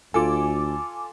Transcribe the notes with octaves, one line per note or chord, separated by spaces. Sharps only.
D2 F4 A4 G#5 D6